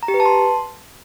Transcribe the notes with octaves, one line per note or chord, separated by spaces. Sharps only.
A#5
G4
B4
A5
C6